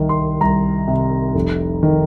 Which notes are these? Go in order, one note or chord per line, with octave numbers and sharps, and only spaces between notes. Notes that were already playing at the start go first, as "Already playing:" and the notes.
Already playing: C2 D#3
C6
C2 A#5
C3
F1
D#3